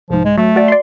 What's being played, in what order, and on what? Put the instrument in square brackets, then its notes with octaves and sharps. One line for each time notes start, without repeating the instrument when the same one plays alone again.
[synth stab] C2 G#2 [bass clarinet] F3
[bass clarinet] G#3
[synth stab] F#3 [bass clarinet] A3
[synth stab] F#4 D5
D5 C6